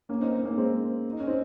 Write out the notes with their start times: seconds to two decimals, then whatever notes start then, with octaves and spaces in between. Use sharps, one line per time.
0.09 A#3 C#4
0.21 C4 D#4
0.33 C4 D#4
0.45 A#3 C#4
0.57 G#3 C4
1.12 D#4
1.20 C#4
1.27 C4 D#4